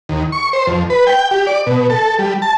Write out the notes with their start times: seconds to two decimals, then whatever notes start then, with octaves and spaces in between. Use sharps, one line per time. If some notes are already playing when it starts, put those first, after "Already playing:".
0.09 D#2
0.32 C#6
0.53 C5
0.67 F2
0.90 B4
1.07 G5
1.31 G4
1.47 D5
1.66 B2
1.90 A4
2.19 G3
2.42 A5